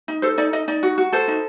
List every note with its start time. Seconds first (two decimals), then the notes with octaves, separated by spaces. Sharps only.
0.08 D#4
0.22 A4 C5
0.38 D#4 D5
0.53 D#4 D#5
0.68 D#4 D5
0.83 F#4
0.98 F#4
1.13 A4 C5
1.28 D#4